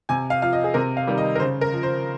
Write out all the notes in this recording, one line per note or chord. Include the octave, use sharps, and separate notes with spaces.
C3 G#5
F5
F3 F5
D#5
G#4
C3 A#4
F5
D#3 G3
D#5
A#4
C#3 C5
A#4
F3
C5